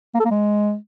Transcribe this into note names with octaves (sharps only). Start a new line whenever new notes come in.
A#3
A4
A#3
G#3